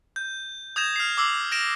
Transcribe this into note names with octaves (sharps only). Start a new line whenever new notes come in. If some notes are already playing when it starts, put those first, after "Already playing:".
G6
D#6 G6 G#6 A#6 E7
F6 C7
D6 E6 C7
F6 A#6 D7 E7